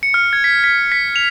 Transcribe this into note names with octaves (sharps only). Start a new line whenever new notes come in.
C#7
F6
G#6
B6
B6
B6
F7